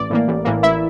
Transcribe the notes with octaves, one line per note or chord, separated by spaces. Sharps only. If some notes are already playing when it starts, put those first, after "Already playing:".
Already playing: A1 D5
A2 E3 A#3
A1
A2 E3 A#3
A1 E4 E5